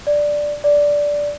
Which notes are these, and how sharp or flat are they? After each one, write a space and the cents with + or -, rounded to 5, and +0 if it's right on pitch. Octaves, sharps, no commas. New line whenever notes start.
D5 +5
D5 -5